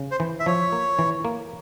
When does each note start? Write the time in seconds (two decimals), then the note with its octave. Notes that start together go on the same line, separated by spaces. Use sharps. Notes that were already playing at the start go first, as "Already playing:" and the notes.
Already playing: C#3
0.11 C5
0.20 E3
0.40 E5
0.46 F3 C#5
0.73 A#3
0.99 E3
1.25 A#3